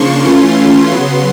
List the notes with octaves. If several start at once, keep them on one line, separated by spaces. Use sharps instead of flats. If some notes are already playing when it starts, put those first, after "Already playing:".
Already playing: C#3 F3 A#3 D4 C6 C#6
E3 A3 C#4 F4 C6
C#3 F#3 B3